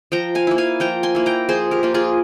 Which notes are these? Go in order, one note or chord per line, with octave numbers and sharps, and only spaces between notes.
F3 G5 A#5
F5 G#5
A#3 E4
F5 G#5
F3 G5 A#5
G#5 C6
A#3 E4
G5 A#5
F3 G#4 C5
G4 A#4
A#3 F4
F4 G#4